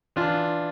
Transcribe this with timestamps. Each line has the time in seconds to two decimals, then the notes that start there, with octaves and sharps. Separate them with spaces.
0.16 E3 D4 F4